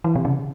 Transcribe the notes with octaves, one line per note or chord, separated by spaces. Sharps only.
E3
C3
C#3